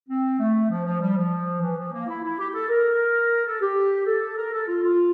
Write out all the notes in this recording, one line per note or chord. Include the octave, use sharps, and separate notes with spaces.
C4
A3
F3
F3
G3
F3
E3
F3
A#3
E4
E4
G4
G4
A4
A#4
A4
G4
A4
A#4
A4
F4
F4